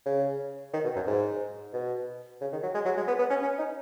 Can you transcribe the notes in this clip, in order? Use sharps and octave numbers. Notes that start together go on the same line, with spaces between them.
C#3
D#3
B2
F#2
G#2
B2
C#3
D#3
F#3
G#3
F#3
G#3
B3
B3
C#4
C#4
D#4